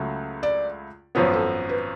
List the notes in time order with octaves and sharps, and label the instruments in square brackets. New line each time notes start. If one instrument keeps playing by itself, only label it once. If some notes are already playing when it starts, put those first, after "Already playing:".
Already playing: [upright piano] C#2 C#3 F#3 A3
[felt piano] D5
[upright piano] G#1 F#2 F3 B3 [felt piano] C#5
[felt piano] A4
B4